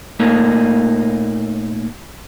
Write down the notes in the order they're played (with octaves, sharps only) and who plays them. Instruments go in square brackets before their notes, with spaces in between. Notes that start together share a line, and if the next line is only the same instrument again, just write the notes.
[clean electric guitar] A#2 A3 A#3 D#4